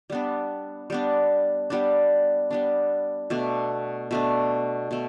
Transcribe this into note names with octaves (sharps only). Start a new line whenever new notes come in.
G3 B3 D4
G3 B3 D4
G3 B3 D4
G3 B3 D4
B2 A3 D4
B2 A3 D4
B2 A3